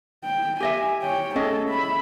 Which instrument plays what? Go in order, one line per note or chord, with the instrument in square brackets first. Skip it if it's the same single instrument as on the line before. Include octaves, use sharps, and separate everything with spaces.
[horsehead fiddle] G5
[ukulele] G4 D#5 E5 [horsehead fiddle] G#5
[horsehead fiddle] C#5 G5
[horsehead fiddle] A3 A4 [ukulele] C#4 G#4 D#5
[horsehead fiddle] E5 B5